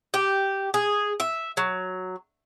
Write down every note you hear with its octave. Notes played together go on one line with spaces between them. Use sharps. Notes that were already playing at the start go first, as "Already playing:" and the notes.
G4
G#4
E5
F#3